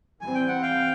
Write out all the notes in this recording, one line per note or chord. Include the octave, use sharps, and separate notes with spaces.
E3 G3 C4 G#5
G5
F#5
F5 G5